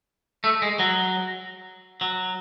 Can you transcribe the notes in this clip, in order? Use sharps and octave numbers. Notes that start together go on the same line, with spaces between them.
A3
G#3
F#3
F#3